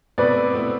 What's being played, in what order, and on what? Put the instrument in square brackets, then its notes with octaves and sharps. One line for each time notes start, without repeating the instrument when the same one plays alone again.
[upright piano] B2 A3 C4 E4 [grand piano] B4 D5
[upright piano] B2 A3 C4 E4